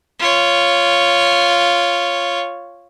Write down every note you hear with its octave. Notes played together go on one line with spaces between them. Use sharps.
F4 C#5